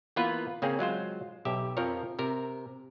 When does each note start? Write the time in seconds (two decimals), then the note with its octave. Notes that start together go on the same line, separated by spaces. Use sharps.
0.16 E3 A#3 B3 F4 B4
0.62 C#3 A#3 C4 C#4 G#4
0.79 F#3 G#3 F4 C5
1.45 B1 G4 E5
1.77 F2 F3 A#4 C#5
2.19 C3 A#4